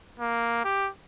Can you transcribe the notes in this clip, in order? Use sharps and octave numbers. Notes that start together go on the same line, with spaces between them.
A#3
G4